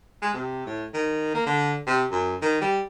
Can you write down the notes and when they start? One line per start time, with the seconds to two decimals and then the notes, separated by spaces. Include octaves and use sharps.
0.22 G#3
0.34 C3
0.66 A2
0.94 D#3
1.34 A#3
1.46 D3
1.87 C3
2.11 F#2
2.42 D#3
2.62 G3